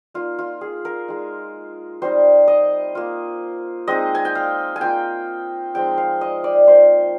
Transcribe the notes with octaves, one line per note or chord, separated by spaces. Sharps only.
A#3 D#4 F4
F4
G#4
A#4
G#3 D#4
G3 C4 D#4 C5
D#5
A#3 F4
G#3 C4 D#4 D#5
G#5
G5
F5
G#5
A#3 F4 G5
F3 G#3 C4 D#4 G5
F5
D#5
D5
F3 A#3 D#4 C5